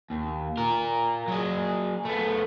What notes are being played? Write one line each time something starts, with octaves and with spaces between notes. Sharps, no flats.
D#2
F4 A#4
F#3 G#4
A3 B3